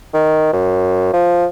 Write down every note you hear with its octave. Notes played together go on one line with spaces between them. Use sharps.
D#3
F#2
F3